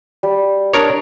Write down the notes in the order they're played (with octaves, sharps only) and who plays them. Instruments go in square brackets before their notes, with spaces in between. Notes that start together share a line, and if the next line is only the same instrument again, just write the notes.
[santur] G3
[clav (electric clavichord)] D4 A#4 C#5 [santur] D#5